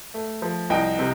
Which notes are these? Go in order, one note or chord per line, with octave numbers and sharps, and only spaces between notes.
A3
F3
C2 D#5 G5
C3